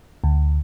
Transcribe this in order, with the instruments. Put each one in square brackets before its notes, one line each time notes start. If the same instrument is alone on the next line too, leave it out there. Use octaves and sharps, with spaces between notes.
[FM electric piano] D2